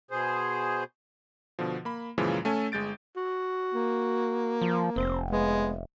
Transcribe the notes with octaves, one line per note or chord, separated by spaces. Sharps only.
B2 G#4 C5
B2 D3 F3
A#3 B5
F#2 A#2 C#3 E3 F3 G#3
A3 C#4 A4 G#5
G1 G#3 G6 A6 D7
F#4
A#3
F3
F1 C4
G#3 B3